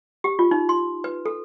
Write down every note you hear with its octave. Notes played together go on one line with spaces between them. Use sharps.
G4
F4
D#4
C6
B4
A4